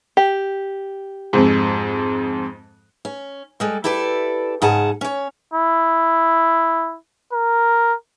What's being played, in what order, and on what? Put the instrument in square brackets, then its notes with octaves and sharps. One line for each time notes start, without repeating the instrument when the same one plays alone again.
[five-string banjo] G4
[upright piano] F2 G#2
[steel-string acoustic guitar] C#4
G3 G#3 A4
E4 G4 A4 B4 D5
G#2 C#3 G#4 F#5 A5
C#4 C#5
[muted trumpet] E4
A#4